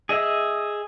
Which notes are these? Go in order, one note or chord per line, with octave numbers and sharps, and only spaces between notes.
G#4 D#5 E5